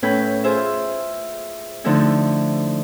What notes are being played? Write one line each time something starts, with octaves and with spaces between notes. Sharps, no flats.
A2 C#4 B4 B5 G6
F4 G#4 C5 E5
D3 F3 A3 D#4 E4